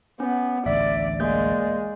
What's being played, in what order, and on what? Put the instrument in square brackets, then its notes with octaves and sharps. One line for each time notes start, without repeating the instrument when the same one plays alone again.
[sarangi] B3 [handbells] C#4
[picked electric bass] A1 D2 [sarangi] D5 [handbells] E5
[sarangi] G#3 [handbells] A#3 D5 G6